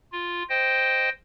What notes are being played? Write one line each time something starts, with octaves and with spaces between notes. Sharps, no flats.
F4
C5 D#5 G5